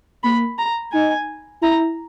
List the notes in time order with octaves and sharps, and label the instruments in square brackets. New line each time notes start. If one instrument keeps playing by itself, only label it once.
[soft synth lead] A#3 [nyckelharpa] B5
[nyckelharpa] A#5
[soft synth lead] D#4 [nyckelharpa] G#5
[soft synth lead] E4 [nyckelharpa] A#5